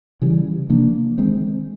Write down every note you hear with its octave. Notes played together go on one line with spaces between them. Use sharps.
C#3 E3 G3
C3 F3 A#3 D4
D#3 G#3 C4